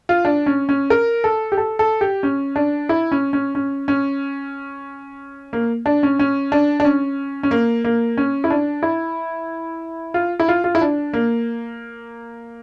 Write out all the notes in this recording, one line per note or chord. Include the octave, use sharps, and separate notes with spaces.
F4
D4
C#4
C#4
A#4
A4
G4
A4
A4
G4
C#4
D4
E4
C#4
C#4
C#4
C#4
A#3
D4
C#4
C#4
D4
D4
C#4
C#4
A#3
A#3
C#4
E4
D4
E4
F4
E4
F4
F4
E4
D4
A#3